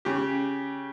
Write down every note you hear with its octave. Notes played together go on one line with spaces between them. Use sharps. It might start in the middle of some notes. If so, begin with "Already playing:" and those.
C#3 G4